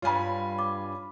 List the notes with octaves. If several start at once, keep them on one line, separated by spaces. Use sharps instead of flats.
G2 F4 C#5 F5 G#5 B5
D6